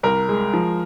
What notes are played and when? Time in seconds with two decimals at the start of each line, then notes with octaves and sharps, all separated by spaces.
0.03 C2 A#4
0.29 G#3
0.53 F3